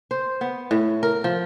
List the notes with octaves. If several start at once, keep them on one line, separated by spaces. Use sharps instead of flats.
C5
B3
A2
A#4
F3